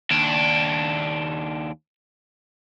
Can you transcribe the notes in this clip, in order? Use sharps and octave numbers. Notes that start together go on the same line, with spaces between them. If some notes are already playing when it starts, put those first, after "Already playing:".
D#2 D4